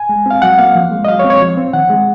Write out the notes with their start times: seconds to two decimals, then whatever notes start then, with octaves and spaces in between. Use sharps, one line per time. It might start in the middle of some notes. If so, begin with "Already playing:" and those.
Already playing: G#5
0.09 G#3
0.26 C4 F5
0.42 F#3 F#5
0.58 A#3 F5
0.75 F3
0.91 G#3
1.05 D#5
1.08 F#3 F5
1.19 C#5
1.24 C4
1.30 C#5
1.41 F3
1.57 C4
1.73 D#3 F#5
1.90 G#3